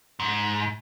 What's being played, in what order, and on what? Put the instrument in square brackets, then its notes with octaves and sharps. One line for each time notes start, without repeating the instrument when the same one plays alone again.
[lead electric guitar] G#2